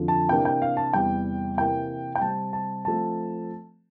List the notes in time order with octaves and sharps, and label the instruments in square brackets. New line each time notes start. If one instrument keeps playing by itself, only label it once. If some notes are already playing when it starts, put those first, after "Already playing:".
Already playing: [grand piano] F2 D3 F3
A5
C3 E3 A#3 D4 G5
G5
F5
A5
E2 C3 E3 G3 G5
C3 E3 A#3 G5
G5
C3 G3 C4 A5
A5
F3 A3 C4 A5